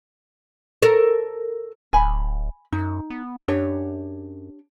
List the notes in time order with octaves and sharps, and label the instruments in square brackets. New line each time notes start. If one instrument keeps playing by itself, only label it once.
[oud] A4 A#4
[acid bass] D1 [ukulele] G#5 B5
[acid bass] F#2 [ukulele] D#4
[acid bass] B3
[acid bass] F#2 [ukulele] D4 G4 C#5